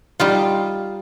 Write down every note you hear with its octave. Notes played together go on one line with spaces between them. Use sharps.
G3 D#4 F4